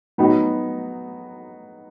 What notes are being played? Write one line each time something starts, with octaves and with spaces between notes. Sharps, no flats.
F#3 B3 D#4 F#4